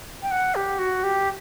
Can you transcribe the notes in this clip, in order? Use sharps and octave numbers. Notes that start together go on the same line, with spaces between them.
G5
F#5
G4
F#4
G4